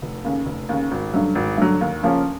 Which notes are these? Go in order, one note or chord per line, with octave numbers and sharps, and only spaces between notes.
F1
D#2 C#3
F1
D#2 C#3
G#1
G2 D3 F#3
G#1
G2 D3 F#3
D#2
C#3 F3 A#3 C#4